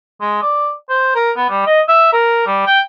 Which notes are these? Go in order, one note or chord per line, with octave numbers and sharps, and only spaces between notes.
G#3
D5
C5
A#4
B3
G3
D#5
E5
A#4
G3
G5